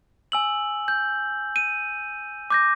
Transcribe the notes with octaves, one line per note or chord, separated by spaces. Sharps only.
G#5 E6 F#7
G6
D#7
D6 G6 A#6